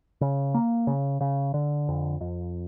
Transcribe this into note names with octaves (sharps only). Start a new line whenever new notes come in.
C#3
A#3
C#3
C#3
D3
F2
F2